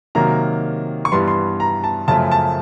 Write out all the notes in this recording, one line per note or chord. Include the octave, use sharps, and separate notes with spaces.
C3 D#3 F#3 A#3 A#5
C#6
G2 E3 G3 B3 C6
C6
A#5
A5
F#2 C#3 F3 A3 A5
A5